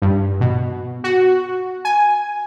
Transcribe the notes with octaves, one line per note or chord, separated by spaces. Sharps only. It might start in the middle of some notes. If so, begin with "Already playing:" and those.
G2
B2
F#4
G#5